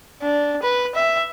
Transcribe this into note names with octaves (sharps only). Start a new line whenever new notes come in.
D4
B4
E5